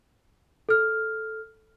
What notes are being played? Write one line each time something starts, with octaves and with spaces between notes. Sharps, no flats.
A4 F6